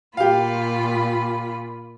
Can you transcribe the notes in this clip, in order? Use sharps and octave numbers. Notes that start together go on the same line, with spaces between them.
A#2 F4 G4 F5 B5